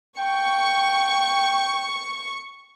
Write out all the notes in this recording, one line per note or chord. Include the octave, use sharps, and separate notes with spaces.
G5 C#6